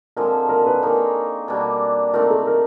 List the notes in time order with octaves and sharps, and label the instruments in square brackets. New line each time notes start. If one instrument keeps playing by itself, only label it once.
[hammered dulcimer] D3 F3 G#3 C4 [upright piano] A#4
[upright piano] A#4
B4
[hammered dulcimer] A#3 D#4 G#4 C#5 [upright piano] A#4
[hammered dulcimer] B2 G3 A#3 D4
[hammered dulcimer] A3 C4 D#4 [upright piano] A#4
[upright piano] A4
A#4